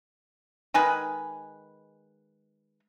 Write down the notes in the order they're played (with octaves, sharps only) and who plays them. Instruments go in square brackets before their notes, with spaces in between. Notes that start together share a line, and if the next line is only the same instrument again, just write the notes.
[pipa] D#3 G#3 G#4 B4